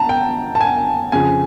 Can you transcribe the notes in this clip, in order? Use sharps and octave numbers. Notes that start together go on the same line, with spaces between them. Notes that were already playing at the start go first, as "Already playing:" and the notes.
Already playing: A5 A#5
G5
A5
G#5
F2 C#3 F3 G#5